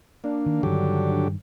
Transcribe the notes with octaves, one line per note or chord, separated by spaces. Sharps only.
A#3 D4
D#3
G2 D3 D#3 F#3 G4